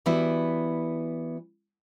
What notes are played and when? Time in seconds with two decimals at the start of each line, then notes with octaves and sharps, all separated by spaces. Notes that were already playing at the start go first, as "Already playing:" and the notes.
0.06 E3 G3 B3 E4 F#4